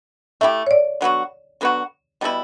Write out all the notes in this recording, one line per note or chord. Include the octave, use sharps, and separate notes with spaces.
A3 E4 G4 E5
C#5
D5
D3 F#3 B3 F#4
D3 F#3 B3 F#4
B2 G3 B3 E4